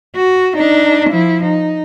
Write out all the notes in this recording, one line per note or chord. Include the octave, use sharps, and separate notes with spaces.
F#4
D4 D#4
F3 E4
D#4